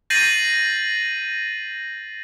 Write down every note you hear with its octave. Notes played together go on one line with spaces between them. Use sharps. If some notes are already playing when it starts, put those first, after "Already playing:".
G6 A6 A#6 C7 D#7 F#7